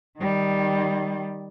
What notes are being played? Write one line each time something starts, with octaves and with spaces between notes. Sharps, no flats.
D#3 G3